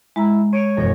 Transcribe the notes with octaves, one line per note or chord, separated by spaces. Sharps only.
G#3 E4 A#5
C#5 D7 D#7
E1 F#2 F3 A#6